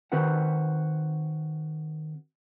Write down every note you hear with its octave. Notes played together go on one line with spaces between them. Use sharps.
D#3 C4 F#4 B4 C5 F#5